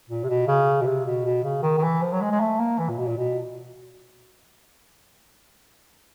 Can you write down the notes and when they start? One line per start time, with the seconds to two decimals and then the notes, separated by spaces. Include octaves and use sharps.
0.10 A#2
0.24 C3
0.28 B2
0.47 C#3
0.81 B2
0.86 C3
1.06 B2
1.25 B2
1.44 C#3
1.63 D#3
1.78 D#3
1.83 E3
2.02 F3
2.12 F#3
2.21 G#3
2.31 G#3
2.40 A3
2.59 A#3
2.78 E3
2.89 A#2
2.98 B2
3.08 A#2
3.17 B2